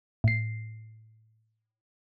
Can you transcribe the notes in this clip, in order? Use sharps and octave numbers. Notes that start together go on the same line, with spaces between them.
A2 C7